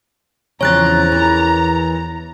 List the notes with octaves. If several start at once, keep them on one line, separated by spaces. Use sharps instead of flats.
E2 C#3 F3 C4 C#5 A#5 F#6 A6
E3 A#4